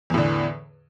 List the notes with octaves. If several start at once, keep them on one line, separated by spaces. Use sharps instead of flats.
E2 A2 D3